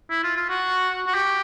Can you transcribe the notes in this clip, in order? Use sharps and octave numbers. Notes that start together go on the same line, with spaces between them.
E4
F4
F4
F#4
F#4
G4